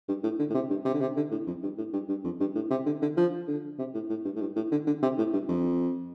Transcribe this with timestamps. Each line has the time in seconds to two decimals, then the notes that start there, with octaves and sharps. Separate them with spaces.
0.08 G2
0.23 A2
0.39 D3
0.50 A2
0.54 C3
0.70 G2
0.85 C3
0.94 D3
1.01 C3
1.16 D3
1.31 A2
1.47 F2
1.63 G2
1.78 A2
1.93 G2
2.09 G2
2.24 F2
2.40 G2
2.55 A2
2.70 C3
2.86 D3
3.02 D3
3.17 F3
3.47 D3
3.79 C3
3.94 A2
4.10 A2
4.25 G2
4.36 A2
4.41 G2
4.56 A2
4.72 D3
4.87 D3
5.02 C3
5.18 A2
5.33 G2
5.49 F2